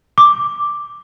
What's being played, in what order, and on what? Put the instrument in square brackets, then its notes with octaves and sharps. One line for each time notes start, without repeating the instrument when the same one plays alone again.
[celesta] D6